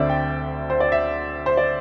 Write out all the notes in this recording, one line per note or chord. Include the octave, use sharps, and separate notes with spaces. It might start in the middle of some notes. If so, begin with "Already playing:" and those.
Already playing: D2 D3 C4 D5 E5
G5
C5
D5
E5
C5
D5